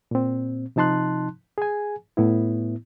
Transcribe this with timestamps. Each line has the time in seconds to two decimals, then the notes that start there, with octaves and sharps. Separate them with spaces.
0.11 A#2 C4
0.76 C3 F3 D#4 A5 C6 F#6
1.58 G#4 G#5
2.17 A2 B3 E4